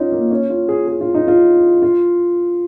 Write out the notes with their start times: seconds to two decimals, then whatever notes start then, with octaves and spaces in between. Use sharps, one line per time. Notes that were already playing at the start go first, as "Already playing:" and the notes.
Already playing: C#4 D#4 F4
0.12 A#3
0.31 C#4
0.50 F4
0.69 G#4
0.88 G#4
1.01 F4
1.15 D#4
1.28 F4
1.82 F4